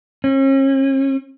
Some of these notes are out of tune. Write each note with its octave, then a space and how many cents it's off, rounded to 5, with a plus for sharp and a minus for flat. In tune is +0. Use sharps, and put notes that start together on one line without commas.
C#4 -40